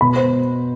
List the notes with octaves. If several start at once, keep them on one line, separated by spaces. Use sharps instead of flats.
B2 B5
C5